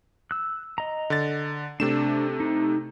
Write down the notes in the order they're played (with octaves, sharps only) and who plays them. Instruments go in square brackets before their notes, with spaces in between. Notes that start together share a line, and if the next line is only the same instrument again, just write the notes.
[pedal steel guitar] E6 F#6
D#5 A#5
[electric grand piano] D3 A6
[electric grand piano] C3 A3 E7 [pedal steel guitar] D4
[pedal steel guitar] D#4